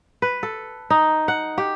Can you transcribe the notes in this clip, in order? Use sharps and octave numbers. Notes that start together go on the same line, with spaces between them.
B4
A4
D#4
F#5
G4